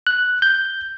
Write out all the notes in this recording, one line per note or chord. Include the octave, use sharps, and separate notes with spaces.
F#6
G6